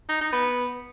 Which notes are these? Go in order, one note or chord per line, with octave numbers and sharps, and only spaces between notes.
D#4
D#4
B3